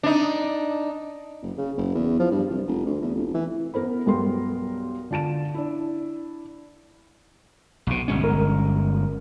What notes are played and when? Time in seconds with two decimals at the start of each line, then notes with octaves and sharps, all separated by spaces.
0.03 D4 D#4
1.43 F#1
1.58 C#3
1.78 F#1
1.94 E2
2.20 F3
2.31 G2
2.51 C2
2.67 F1
2.86 D2
3.02 E2
3.15 F1
3.35 E3
3.74 B3 A#4 C5 B5
4.06 B1 G2 B3 A#4 G5 C6
5.11 D3 F4 A5 D7 E7
5.54 D4 E4
7.87 B1 B2
8.08 G1 G#3 C#4
8.24 A#4